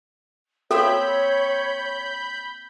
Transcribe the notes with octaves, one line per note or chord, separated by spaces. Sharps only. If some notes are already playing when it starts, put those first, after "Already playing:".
A#3 C4 A4 C#5 E5 B5 G6